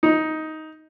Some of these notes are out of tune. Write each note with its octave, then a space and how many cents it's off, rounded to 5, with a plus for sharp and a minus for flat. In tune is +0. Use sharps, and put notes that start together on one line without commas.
D#4 +10